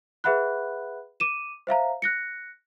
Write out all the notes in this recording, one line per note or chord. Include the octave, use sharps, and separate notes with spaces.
G#4 B4 E5 F#5 B5 F#6
D6 D#7 E7
C5 E5 F5 A#5
F#6 A#6 C#7